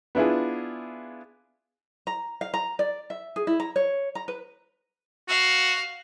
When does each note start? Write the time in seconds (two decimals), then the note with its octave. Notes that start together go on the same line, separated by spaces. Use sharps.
0.15 B3 D4 E4 F4 G#4
2.07 A#5
2.41 F5
2.54 A#5
2.79 D5
3.10 E5
3.36 G#4
3.47 E4
3.60 A#5
3.76 C#5
4.15 A#5
4.28 B4
5.29 F#4 F5